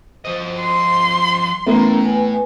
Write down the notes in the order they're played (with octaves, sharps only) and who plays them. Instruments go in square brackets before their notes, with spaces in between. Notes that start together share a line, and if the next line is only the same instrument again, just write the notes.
[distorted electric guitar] F3 D#5 [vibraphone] C5
[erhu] C6
[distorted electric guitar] A2 [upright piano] E3 A3 B3 [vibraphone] C#4 A#4 A#5
[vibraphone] B4 G#5